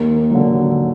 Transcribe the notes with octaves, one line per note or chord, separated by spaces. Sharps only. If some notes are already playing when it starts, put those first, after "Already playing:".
Already playing: D#2 A#4
D3 F#3